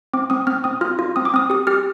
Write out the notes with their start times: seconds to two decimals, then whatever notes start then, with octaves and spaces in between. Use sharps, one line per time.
0.14 C4 D6
0.30 C4 D#6
0.47 C4 F6
0.64 C4 D#6
0.81 F4 F6
0.99 F4
1.16 C4 D#6
1.25 D6
1.34 C4 D#6
1.50 G4 D#6
1.67 G4 F6